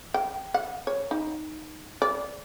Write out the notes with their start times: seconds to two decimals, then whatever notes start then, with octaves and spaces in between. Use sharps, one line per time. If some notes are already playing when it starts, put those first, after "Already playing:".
0.14 G5
0.54 F#5
0.87 C#5
1.11 D#4
2.02 D5